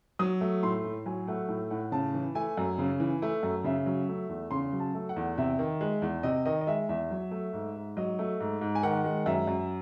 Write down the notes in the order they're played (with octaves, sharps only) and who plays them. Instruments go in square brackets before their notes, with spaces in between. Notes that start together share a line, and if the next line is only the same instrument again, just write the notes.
[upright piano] F#3 D#6
A3
A2 C6
A2
F#3 G#5
A3 F#5
A2
A2 F#5
C#3 A5
E3
A3 G#5
F#2
C#3
E3
A3
F#2
C#3 E5
F#3
A3
E2
C#3 C6
F#3
A5
A3
F#5
E2
C3 E5
D#3
G#3
E2
C3 D#5
D#3 D#5
D#5
G#3 E5
E2 E5
F#3
A3
G#2
G#2
F#3 D#5
A3
G#2
G#2
G#5
D#3 F#5
G#3
F#2 E5
F#2